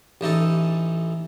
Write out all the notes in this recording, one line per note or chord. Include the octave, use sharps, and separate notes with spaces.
A1 E3 D#4 A4